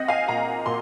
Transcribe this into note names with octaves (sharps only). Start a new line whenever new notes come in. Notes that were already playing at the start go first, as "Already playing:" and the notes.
Already playing: C4 D#5 F#5
F5 G#5
A#2 F#5 A#5
A#2 C6